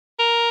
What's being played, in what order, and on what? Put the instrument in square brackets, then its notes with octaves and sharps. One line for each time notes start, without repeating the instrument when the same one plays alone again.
[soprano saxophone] A#4